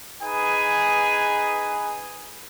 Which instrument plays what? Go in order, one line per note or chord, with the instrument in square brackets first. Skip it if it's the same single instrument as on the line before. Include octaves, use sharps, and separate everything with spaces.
[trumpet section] D#4 G#4 B4 G#5